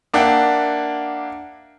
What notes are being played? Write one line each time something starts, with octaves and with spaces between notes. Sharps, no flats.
A#3 D4 E5 F#5 G5